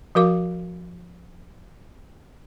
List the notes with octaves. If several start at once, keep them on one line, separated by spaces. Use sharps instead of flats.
F3 F#4 A#4 F5 D6